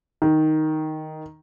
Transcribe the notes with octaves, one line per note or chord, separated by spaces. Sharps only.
D#3